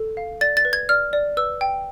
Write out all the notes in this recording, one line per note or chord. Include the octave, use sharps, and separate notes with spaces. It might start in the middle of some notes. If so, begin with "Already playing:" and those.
Already playing: A4
F5
D5 A6
A6
B4
G#6
D5 F6
D5
B4 E6
G5